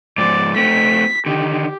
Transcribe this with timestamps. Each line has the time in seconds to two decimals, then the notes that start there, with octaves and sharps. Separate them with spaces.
0.18 G#2 F3 D5
0.56 A3 C4 B6
1.26 D3 D#3 G4